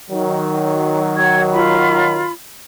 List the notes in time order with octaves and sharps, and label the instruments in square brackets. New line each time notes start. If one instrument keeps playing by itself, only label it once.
[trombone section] D#3 F#3
[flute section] F#5 G#6
F4 B5